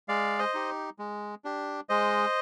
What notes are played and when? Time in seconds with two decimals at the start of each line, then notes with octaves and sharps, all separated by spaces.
0.08 G#3 D5 F5
0.39 C5 D#5
0.54 D#4 G4
0.99 G#3
1.45 D4 G4
1.89 G#3 C5 D#5